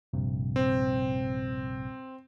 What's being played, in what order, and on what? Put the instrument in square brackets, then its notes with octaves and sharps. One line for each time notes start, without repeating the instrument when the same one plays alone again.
[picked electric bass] A#1 G2 C3
[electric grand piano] C4